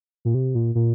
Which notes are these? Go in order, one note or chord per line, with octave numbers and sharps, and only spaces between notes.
A#2
C3
A#2
A#2